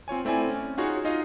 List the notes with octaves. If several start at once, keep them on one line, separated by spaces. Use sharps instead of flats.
C4 F4 C#5 G#5
A3 C4 E4 D5 G#5
C#4
D#4 F4 F#4 G#4 C#5
D#4 F4 D#5 F5